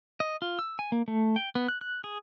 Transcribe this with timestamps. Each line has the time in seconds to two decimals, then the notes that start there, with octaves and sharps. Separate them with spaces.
0.20 D#5
0.42 F4
0.59 E6
0.79 G#5
0.92 A#3
1.08 A3
1.36 G5
1.55 B3
1.68 F#6
1.81 F#6
2.04 G#4